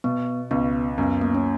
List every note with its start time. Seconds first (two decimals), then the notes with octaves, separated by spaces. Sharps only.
0.04 B2 B3
0.51 C#2 B3
0.98 F#2 B3
1.21 A#3
1.35 C#4